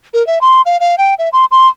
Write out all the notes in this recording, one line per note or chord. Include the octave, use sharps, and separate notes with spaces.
A#4
E5
C6
F5
F5
G5
E5
C6
C6